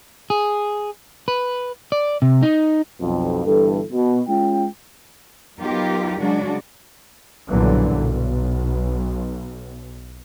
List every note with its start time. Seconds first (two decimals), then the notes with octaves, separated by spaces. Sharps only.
0.30 G#4
1.28 B4
1.92 D5
2.22 C3
2.43 D#4
3.01 B1 F2
3.45 G1 G2 E3 A4
3.92 B2
4.29 G#3 C#4 F4 G5
5.58 F#3 B3 D#4 F4 G4 A#4
6.19 C#3 F#3 G#3 D4 F#4
7.48 B1 G2 A#2 D3 E3 F#3
7.94 B1